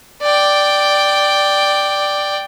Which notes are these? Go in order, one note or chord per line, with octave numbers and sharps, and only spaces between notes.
D5 G5